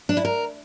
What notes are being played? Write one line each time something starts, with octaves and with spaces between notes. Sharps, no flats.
D4
E4
A#4